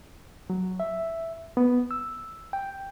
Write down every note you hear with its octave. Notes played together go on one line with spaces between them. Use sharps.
F#3
E5
B3
E6
G5